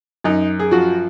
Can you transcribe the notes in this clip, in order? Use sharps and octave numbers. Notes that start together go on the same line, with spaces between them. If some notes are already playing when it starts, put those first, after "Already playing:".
F#2 D#4
G#4
F3 F#4